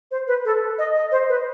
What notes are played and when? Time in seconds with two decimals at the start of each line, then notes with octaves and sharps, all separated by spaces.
0.11 C5
0.27 B4
0.45 A4
0.79 D#5
0.95 D#5
1.12 C5
1.29 B4